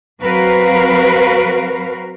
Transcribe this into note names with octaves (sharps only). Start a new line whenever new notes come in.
F#3 C4 F#4 A#4 B4 F5